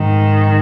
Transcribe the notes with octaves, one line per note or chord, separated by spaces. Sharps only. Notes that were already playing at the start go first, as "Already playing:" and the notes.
Already playing: G#2 D#3